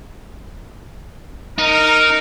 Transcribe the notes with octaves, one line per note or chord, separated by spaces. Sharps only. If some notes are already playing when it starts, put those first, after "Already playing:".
D#4 A#4